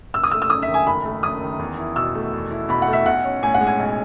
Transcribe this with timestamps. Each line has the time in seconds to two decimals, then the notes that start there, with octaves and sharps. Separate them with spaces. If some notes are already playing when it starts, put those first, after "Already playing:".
0.14 F#1 E6
0.24 D#6
0.31 A3 E6
0.42 E6
0.50 F#2 D#6
0.62 E5
0.68 D#3
0.74 G#5
0.87 F#1 B5
1.05 A3
1.23 F#2 D#6
1.42 D#3
1.59 E2
1.78 E4
1.96 B2 E6
2.15 A3
2.33 E2
2.51 E4
2.69 B2 B5
2.82 A3 F#5
2.93 E5
3.06 B1 F#5
3.25 C#4
3.43 A2 G#5
3.54 F#5
3.61 G#3
3.67 G#5
3.79 B1